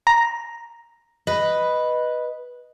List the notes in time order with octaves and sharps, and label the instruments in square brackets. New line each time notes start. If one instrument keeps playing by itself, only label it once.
[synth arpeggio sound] A#5
[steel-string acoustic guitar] B4 D#5